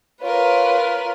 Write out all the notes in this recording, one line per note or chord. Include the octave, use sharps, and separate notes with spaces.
F4 A#4 B4 C#5